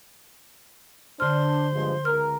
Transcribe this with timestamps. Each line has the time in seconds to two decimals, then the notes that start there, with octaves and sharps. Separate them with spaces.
1.20 D3 D4 C5 C6 F6
1.73 G2 F3 G#3
2.05 C#2 A#4 F6